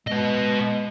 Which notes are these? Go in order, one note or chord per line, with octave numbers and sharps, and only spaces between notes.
G#3 B3 D#5